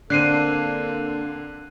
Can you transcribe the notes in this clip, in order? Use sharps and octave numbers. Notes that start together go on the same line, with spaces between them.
D3 A#3 C4 D4 A4 F#6 C7 D#7